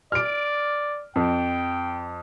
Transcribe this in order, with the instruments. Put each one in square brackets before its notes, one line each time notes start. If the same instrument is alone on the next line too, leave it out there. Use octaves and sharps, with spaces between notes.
[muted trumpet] D5 [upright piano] F6 D7
[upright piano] F2 [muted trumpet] G5